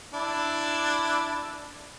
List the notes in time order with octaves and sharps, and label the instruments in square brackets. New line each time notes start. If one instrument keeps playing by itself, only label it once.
[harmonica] D4 E4